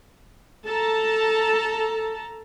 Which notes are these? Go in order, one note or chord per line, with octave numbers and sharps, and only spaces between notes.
A4 A5 A#5